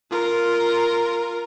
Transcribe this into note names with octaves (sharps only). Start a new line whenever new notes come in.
F4 A#4